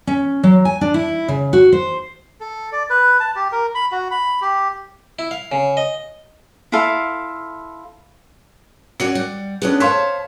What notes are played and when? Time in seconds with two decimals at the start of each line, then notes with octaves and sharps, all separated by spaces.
0.07 C#4
0.43 F#3
0.65 G#5
0.81 D4
0.94 E4
1.28 C#3
1.53 F#4
1.72 C5
2.40 A4
2.72 D5
2.90 B4
3.20 A5
3.36 G4
3.52 A#4
3.75 B5
3.92 F#4
4.11 B5
4.42 G4
5.19 E4
5.31 F5
5.52 C#3
5.77 D#5
6.72 E4 F4 A4 F5
9.00 C#4 F#4 D5 C#7
9.15 G3
9.62 B3 C#4 D4 G#4 A4
9.80 C5 C#5 F5 A5 C6 B6